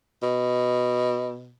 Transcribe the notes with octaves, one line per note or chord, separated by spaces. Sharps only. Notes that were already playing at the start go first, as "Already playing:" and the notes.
B2